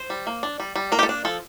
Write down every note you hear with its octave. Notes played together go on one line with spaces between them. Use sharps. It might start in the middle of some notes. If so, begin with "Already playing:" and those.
Already playing: C5
G3
A#3
D4
G3
G3
A#3 A#4
G4
A4
D4
F3 A4